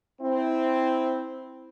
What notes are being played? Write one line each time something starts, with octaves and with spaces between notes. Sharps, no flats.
C4 E4